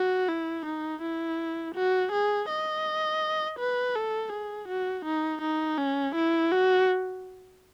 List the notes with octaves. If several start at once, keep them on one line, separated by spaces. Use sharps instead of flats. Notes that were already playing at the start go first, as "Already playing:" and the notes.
Already playing: F#4
E4
D#4
E4
F#4
G#4
D#5
B4
A4
G#4
F#4
D#4
D#4
C#4
E4
F#4